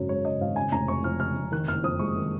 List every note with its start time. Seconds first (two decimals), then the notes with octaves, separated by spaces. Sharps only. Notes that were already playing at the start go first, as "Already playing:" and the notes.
Already playing: G#1 F#2 C#3
0.09 G#3 C#5
0.25 C#3 D#5
0.41 G#1 F5
0.56 C#3 G#5
0.72 F1 A#5
0.88 F2 C#6
1.04 F3 F6
1.20 C#3 F6
1.36 F1
1.52 D#3 F#6
1.68 F#1 F6
1.84 F2 D#6
1.99 G#3 C#6
2.16 D#3